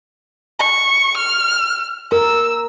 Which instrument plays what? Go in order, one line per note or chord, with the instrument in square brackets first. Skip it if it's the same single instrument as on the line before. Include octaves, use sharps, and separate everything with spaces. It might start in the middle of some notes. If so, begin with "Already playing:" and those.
[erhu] C#6
F6
[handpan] A#4 [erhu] E6